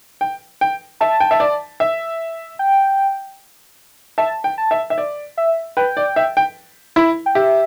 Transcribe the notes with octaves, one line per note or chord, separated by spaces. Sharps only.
G5
G5
E5 A5
G5
E5
D5
E5
G5
E5 A5
G5
A5
E5
E5
D5
E5
B4 G5
D5
E5
G5
E4
G5
G4 E5